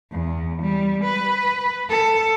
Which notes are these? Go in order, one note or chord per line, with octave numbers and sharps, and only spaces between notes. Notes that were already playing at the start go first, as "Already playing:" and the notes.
E2
G3
B4
A4